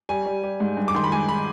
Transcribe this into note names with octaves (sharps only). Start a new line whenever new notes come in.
G3 G#5
G3
G3
G#2
G2
D6
D#3 C6
B5
G#3 G#5
B5